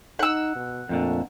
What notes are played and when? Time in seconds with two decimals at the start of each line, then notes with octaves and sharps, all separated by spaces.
0.19 D#4 F#5 E6
0.56 B2
0.89 F2 A#2 D3 A3